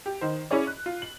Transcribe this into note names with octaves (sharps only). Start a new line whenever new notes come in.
G4
D#3 C5
C#4 E4 G#4 C#5 D5
F#6
F4
F#7